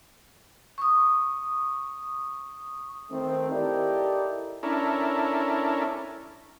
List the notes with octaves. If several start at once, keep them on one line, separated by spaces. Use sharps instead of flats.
C#6 D#6
D#3 A3 C4
D#4 E4 G4 A4 A#4 D5
C#4 D4 E4 A4 A#4